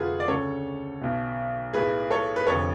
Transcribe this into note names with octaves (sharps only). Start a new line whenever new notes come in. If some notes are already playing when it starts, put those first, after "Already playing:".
Already playing: F1 F2 D3 F4 F#4 G#4 A4 B4
D5
D2 C#3 A4 C#5
B1 B2
B1 A2 G#4 B4
A4 C#5
B4
F1 F2 D3 A4 C#5